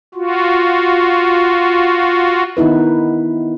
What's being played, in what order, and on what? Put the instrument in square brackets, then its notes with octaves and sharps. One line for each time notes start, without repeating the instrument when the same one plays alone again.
[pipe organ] F4 F#4
[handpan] D#3 B3 D#4 E4 B4